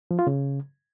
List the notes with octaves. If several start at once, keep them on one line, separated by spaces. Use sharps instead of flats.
F3
F4
C#3